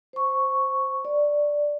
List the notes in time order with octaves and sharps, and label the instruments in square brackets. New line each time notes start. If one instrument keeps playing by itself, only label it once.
[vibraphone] C5 C#6
D5